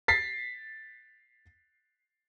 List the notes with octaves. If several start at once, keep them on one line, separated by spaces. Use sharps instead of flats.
A6 B6 C7